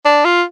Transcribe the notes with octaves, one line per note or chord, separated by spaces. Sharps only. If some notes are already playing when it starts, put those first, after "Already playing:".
D4
F4